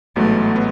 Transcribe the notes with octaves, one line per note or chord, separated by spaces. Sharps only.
A1 G#2 F#3 A3 B3
B3